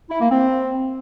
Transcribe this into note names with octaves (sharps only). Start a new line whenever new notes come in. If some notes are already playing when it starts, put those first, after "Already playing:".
E4
A#3
C4